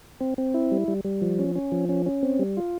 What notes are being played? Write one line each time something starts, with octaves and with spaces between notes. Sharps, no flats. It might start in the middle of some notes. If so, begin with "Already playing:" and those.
C4
C4
E4
G3
G3
G3
F3
C#4
C#4
F3
C#4
C#4
C4
G3
F4